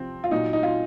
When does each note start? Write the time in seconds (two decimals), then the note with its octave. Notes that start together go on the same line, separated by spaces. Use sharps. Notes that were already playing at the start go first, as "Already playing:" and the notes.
Already playing: C3 F3 C4
0.24 F4
0.31 A#2 F#3 D#4
0.53 D#4
0.63 F4